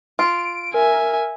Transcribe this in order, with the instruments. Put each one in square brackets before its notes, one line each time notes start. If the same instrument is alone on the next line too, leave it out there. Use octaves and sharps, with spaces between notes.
[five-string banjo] F4 [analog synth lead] D7
[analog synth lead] A#4 [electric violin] E5 G#5